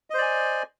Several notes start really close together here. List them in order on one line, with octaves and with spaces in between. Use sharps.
D#5 C5 D5 G#5